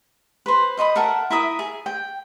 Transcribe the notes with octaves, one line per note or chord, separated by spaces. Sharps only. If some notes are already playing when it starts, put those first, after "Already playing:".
B4 C5
C5 D#5 B5 D#6
A4 A#4 E5 F#5
E4 A#4 E5 D#6
G#4
G5